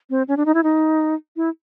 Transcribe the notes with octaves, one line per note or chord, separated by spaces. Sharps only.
C4
C#4
D4
D#4
E4
D#4
E4